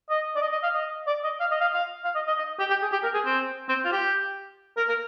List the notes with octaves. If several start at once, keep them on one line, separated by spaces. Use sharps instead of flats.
D#5
D5
D#5
D#5
F5
D#5
D5
D#5
F5
D#5
F5
F5
F5
D#5
D#5
D#5
G4
G4
G#4
G4
A#4
G#4
C4
C4
F4
G4
A#4
A#4